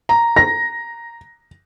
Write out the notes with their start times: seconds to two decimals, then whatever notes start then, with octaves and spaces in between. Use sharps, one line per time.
0.09 A#5
0.36 A#6